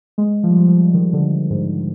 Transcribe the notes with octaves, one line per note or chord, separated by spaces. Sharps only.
G#3
F3
G3
F3
F3
D#3
D3
G#2